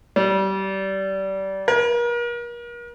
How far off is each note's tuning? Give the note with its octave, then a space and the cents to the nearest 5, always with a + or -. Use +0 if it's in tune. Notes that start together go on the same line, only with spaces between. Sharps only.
G3 -25
A#4 +40